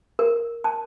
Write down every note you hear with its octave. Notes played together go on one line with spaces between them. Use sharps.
A#4
A5